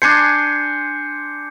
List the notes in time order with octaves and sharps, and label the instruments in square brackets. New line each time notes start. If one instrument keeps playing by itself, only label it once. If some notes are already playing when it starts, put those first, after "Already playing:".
[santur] D4 G#5 C6 [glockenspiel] G6 C7 C#7